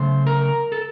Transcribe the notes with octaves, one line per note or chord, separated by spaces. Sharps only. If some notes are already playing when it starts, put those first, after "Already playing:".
Already playing: C#3 F#3 A3 C5
A#4
A4